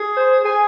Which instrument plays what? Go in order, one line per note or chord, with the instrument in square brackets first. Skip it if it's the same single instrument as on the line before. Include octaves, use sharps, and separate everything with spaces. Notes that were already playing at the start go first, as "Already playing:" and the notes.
Already playing: [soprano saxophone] G#4
[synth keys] C5
[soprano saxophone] G#4 [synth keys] G#5